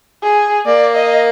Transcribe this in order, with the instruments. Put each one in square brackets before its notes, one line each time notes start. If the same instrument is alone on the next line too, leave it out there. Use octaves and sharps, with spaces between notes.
[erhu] G#4
[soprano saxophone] A#3 [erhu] D5
[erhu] D#5